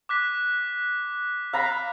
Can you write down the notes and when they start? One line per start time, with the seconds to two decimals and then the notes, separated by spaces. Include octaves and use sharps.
0.09 D6 F#6 B6
1.53 F5 A#5 B5